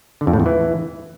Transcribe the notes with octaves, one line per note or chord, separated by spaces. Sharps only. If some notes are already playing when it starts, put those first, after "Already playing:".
D3
F2
A2
E2
E3